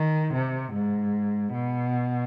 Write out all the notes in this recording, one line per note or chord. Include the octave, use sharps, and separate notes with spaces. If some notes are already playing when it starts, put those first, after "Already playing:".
Already playing: D#3
C3
G#2
B2